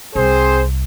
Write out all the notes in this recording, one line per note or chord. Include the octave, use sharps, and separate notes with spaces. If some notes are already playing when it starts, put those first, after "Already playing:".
C2 C4 G#4 C5